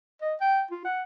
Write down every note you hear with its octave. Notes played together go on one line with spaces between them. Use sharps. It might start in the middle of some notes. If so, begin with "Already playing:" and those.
D#5
G5
F4
F#5